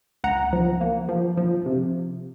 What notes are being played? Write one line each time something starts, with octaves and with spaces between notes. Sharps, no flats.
C#2 F#5 A#5
F3
A#3
F3
F3
C3